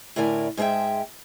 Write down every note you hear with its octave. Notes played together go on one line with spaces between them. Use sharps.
A2 D3 E4 A#4 D5 G#5
G#2 G#3 G#4 E5 G5